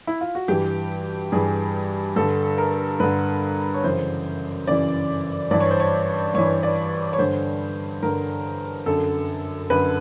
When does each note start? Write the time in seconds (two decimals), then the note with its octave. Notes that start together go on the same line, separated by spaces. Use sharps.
0.07 E4
0.21 F4
0.35 F#4
0.48 G2 E3 G4
1.32 G2 E3 G#4
2.16 G2 D3 A4
2.58 A#4
3.00 G2 D3 B4
3.74 C#5
3.83 F#2 C#3 E3 C5
4.67 F#2 C#3 E3 D5
5.51 G2 E3 D5
5.60 C#5
5.71 C5
5.80 C#5
6.34 G2 E3 C#5
6.63 D5
7.13 C#5
7.19 G2 D3 C5
8.02 G2 D3 A#4
8.86 F#2 D3 A4
9.70 F#2 D3 B4